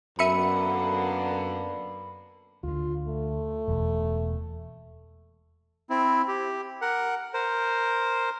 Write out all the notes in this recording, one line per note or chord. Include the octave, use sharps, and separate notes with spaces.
F#2 D3 A#3 B3 E5 B5 C#7 D#7
D2 D3 F4
A3
E1 E2 B2
C4 E4
G4
A#4 F#5
A#4 C5